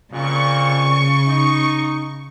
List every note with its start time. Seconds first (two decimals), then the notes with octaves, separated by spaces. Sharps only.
0.12 F2 A#2 C#3 C#6
1.26 D#4